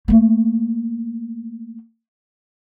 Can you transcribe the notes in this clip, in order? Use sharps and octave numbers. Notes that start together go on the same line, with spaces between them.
A3 A#3